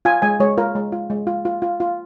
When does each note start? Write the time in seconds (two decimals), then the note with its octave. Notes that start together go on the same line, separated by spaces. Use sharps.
0.05 F4 G#5
0.22 G#3 G#5
0.40 G#3 C#5
0.58 F4 A#4
0.75 G#3
0.92 F4
1.10 G#3
1.27 F4
1.45 F4
1.62 F4
1.80 F4